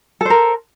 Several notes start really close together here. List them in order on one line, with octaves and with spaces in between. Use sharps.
A4 C5 A#4